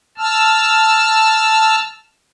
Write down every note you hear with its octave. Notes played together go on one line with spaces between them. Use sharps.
A5 E6 F6